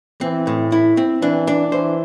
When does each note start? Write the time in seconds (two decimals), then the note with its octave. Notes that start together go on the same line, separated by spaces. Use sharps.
0.21 E3 C4
0.47 A2
0.72 E4
0.97 C4
1.22 E3 D4
1.47 D4
1.72 E3 C5